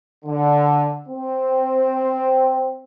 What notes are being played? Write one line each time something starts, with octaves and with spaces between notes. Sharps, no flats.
D3
C4